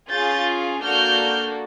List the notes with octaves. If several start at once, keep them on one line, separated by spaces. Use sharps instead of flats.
C#4 F4 G#4 G6 A6
A#3 D4 F#4 A4 F6 G6